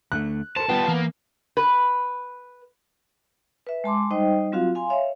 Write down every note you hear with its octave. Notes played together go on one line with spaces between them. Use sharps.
D2 D3 A3 F#6
A4 A#4 C5 A5
G3 B3 F4 G5
E3 A#3
B4
B4 E5
G#3 A5 C6 D6
G3 D#4 C5 D#5 G5
F#3 C4 F4 F#4 F5
F5 G#5 C6
C#5 E5 F5